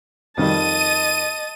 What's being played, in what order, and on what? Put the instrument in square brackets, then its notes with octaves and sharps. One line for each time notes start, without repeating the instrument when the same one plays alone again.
[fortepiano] F2 D#3 G3 [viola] D#5 A5 [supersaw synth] D#7